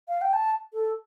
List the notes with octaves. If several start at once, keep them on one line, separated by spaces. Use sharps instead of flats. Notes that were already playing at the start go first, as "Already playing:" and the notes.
F5
G5
A5
A4